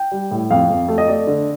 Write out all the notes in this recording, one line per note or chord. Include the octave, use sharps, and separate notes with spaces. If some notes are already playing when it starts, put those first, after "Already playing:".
Already playing: G5
G3
A2
F2 F5
F2
A3
D#5
A3 D5
D3